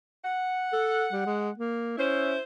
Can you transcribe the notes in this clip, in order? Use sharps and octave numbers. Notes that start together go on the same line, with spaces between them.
F#5
A4
G3
G#3
A#3
C#4 E4 C5